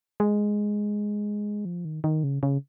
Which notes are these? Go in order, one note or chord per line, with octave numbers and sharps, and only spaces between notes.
G#3
F3
D#3
D#3
C#3
C#3